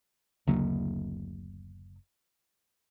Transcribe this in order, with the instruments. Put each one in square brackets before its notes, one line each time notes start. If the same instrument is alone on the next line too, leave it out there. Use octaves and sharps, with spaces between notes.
[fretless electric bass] F#1 C#3 A#3 [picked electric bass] D2 F#3